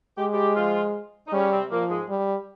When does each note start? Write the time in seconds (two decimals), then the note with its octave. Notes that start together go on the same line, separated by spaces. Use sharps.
0.18 G#3 G4
0.33 G3 G4
0.56 F3 F4
1.27 D#4
1.32 C#3 G3 C#4
1.51 C3 C4
1.71 A#2 F3 A#3
1.89 G#2 G#3
2.09 G3